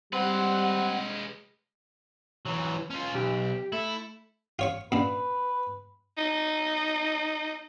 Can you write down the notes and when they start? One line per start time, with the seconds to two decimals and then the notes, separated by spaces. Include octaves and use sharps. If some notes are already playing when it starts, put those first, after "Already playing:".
0.13 G3 G#3 C4 B4 F#5
2.45 E3 F#3
2.91 C#4 F4
3.15 B1 G4
3.72 A3 E4
4.59 F4 C#5 C#6
4.92 A#2 D4 B4
6.18 D#4